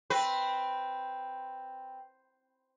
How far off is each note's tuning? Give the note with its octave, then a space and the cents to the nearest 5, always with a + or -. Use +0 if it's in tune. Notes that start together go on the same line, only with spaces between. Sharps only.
C4 +0 B4 +0